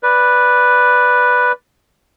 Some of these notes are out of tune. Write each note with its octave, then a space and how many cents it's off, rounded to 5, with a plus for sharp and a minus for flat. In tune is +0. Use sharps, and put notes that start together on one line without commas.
B4 +0 D5 +0